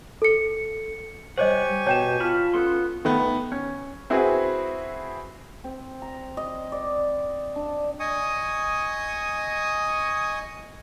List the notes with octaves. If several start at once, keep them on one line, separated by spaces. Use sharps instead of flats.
A4 C#7
G3 G4 C5 C#5 D#5 F#5 G#5 C#6
B2 C#5 G5 A5 G6 E7
F4 A5 B5 F6
B3 C#4 A4 C6
D#3 A3 B3
C#4
C4 E4 F#4 G#4 B4
C4
A#5
D#5
D5
D4
D#5 G#5 C#6 D#6